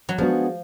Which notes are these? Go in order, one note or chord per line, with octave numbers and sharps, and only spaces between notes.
F#3
F3 G#3 B3 D4 F#4